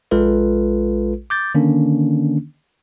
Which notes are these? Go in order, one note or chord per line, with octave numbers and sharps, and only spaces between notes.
A#1 G#3 F4 A4 B4
D6 G6 A6
D3 D#3 A#3 C#4 D4